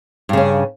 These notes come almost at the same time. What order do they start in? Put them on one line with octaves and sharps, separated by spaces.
G2 C#3 C#4